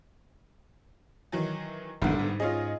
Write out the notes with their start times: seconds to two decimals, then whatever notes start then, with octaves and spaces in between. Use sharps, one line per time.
1.32 D#3 E3 F#3
2.02 E1 B1 A2 D3 D#3 G3 B3
2.19 G#2
2.40 C#4 F4 G#4 D#5